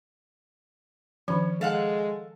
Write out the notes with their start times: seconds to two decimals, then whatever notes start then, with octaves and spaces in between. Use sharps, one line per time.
1.28 D#3 F3 C#4
1.61 G#3 A4 F5 F#5